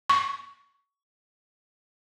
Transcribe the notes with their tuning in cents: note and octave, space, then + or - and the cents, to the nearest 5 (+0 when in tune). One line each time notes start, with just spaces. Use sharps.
C#6 +20